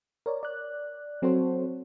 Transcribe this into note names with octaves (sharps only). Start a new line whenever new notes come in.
A#4 C#5 D5
D5 F#6
F#3 C4 F#4 A4 C5 C#5